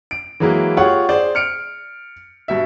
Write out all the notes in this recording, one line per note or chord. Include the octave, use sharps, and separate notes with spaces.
D7
E3 F#3 G#3 A#3 E4 F#4
F4 G4 G#4 C#5 F#5 C#6
G#4 C5 D5
F6 C#7 D7
G2 B2 E5